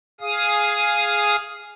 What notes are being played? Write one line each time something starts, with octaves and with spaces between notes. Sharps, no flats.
G#4 F5 D#6